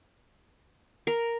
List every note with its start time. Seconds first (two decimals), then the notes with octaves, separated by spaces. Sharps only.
1.07 A#4